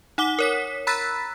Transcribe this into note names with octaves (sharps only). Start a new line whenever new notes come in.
D#4 F#5 D6 G7
A#4 C#5 B6
A#5 B5 E6 F#6 A6 B6